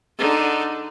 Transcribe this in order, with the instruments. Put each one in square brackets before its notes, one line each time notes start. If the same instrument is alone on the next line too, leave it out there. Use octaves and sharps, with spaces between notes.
[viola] D3 D#4